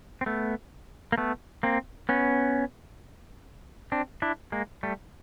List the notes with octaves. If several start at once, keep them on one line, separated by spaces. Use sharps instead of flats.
C4
A3 B3
A#3
A3 B3
A#3 C4
B3 C#4
C4 D4
D4 E4
G#3 A#3
G3 A3